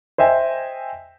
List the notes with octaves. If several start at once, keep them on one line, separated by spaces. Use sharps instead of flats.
C5 D#5 E5 G5 G#5